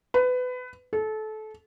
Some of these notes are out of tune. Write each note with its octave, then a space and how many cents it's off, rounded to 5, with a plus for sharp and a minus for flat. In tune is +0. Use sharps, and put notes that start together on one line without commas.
B4 +25
A4 -25